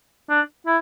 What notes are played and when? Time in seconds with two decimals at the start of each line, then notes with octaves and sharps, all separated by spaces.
0.29 D4
0.66 E4